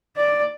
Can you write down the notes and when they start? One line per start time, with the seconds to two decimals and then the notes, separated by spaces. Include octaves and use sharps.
0.17 D5